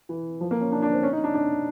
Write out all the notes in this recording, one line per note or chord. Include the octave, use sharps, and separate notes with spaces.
E3
F3
A#3
C#4
D4
D4
C4
C#4
D#4
D4
D4